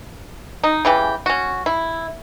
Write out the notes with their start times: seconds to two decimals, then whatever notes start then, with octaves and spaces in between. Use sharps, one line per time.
0.63 D#4
0.85 C#3 E3 G4
1.26 C#4 F#4
1.66 E4